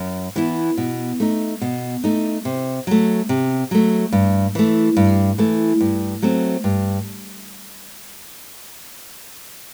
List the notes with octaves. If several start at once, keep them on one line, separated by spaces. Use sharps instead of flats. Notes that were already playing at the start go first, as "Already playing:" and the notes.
Already playing: F#2
E3 B3 E4
B2
A3 D#4
B2
A3 D#4
C3
F#3 A3
C3
F#3 A3
G2
E3 A3
G2
E3 A3
G2
F#3 A3 C4
G2